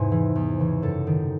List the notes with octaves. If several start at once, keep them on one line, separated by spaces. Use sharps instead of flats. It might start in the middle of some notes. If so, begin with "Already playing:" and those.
Already playing: E2 G#2 C3 G#5
E3
E2
C#3 E3
F#2 A4
D#3